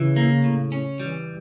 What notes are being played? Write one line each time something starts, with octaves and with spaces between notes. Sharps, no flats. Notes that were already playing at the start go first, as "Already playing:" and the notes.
Already playing: C#3 E3
A#3
A2
C#4
E3 G3